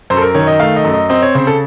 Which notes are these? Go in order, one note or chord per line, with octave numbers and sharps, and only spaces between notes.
F#2 C5
A4
A#4
D#3 C#5
D#5
A3 F5
D#5
F#2
D#5
C4 D#5
C#5
C#3 C5
A4